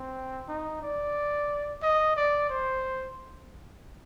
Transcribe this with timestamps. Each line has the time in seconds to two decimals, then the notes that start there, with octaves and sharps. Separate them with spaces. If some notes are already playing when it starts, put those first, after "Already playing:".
Already playing: C4
0.48 D#4
0.83 D5
1.82 D#5
2.16 D5
2.50 C5